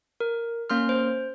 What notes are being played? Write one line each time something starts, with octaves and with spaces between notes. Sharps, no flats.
A#4
A#3 C#4 C6 F6
C5